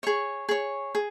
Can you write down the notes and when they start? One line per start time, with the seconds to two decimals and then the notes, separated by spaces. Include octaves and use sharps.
0.03 G#4 C#5 C#6
0.49 G#4 C#5
0.95 G#4